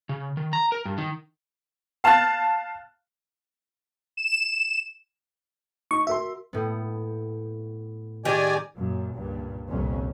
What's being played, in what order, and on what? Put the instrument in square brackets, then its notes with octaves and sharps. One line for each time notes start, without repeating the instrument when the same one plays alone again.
[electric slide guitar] C#3
D#3
A#5
A#4
G2
D#3
[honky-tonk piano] F5 A5 F6 F#6 A6
[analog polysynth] E7
[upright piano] D#4 [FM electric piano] C#6
[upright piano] F#4 A#4 C6 [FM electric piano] E5
[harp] A2 B3
[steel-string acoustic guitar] D#3 G4 G#4 [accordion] D5 G#5
[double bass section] F#2 A#2
C#2 G2 A#2
G1 C2 F2 A#2 C#4